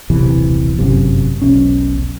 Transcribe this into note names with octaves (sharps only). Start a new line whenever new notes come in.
D#1 B1 C3 E3
G1 F#2 C3
E1 B1 C#4